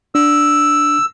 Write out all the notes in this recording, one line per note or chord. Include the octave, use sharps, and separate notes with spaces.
D4 E6